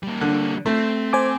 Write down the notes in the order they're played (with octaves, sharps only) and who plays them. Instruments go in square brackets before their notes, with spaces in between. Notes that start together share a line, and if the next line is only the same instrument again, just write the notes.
[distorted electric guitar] G3 A#3
[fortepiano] D3
[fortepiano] A3 [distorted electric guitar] C4
[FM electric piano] C5 G#5 D6